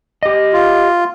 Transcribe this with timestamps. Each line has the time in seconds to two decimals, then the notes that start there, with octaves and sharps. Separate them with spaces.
0.23 G4 D#5
0.53 F4